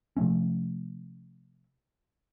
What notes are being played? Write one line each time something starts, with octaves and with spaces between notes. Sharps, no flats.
C3 F3 A3 C#4